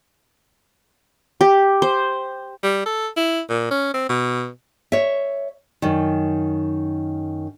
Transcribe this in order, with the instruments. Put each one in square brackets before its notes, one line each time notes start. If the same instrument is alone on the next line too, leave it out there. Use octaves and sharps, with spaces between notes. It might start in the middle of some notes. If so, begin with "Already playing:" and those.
[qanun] G4
C5
[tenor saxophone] G3
A4
E4
A#2
C#4
C4
B2
[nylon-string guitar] C#5 E5
F#2 D#3